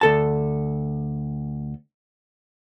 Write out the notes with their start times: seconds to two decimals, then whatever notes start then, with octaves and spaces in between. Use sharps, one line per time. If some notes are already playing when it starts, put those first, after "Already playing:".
0.01 D2 A4 A5